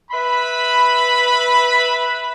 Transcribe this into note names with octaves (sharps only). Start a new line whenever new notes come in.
B4 E5 B5